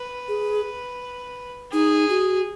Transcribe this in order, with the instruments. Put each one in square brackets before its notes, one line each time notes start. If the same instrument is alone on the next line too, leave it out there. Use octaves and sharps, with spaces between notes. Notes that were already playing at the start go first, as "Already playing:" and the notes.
Already playing: [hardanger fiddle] B4
[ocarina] G#4
[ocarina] D#4 [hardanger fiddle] G#4
[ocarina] F#4